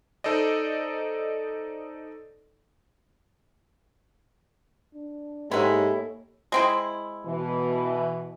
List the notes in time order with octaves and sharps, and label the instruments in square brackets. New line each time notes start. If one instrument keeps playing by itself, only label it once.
[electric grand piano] D#4 A4 C5 D5 D#5
[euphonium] D4
[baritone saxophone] G#2 [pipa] G#3 E4 [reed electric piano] A#3 A4 C#5 [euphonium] G4
[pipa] G#3 C4 E4
[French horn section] B2 E3